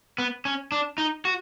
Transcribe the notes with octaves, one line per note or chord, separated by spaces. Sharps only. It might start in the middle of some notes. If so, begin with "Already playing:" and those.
B3
C#4
D4
D#4
F#4